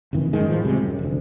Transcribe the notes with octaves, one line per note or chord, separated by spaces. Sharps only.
F#1 F2 D#3 E3
G1 F#2 D#3 G#3
A2 E3 F3
C#2 C3 G3 G#3
F#2
F1 D2